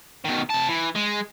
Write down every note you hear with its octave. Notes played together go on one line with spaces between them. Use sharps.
B2 D#3
C3 A5
E3
G#3